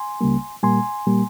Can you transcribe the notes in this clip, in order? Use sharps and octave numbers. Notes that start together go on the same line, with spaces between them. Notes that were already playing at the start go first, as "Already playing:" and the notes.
Already playing: G#5 C6
C#2 C#3 G3 A#3
A#2 G3 A#3 G#5 C6
A#2 G3 A#3